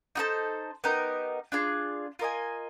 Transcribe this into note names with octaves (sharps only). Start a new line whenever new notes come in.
D#4 F#4 A4 C5
B3 D#4 G4 A#4
D4 F4 G#4
F4 A#4 D#5 G#5